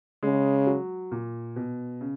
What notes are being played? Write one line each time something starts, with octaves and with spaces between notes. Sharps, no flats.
C#3 G#3
F#3
A#2
B2
C#3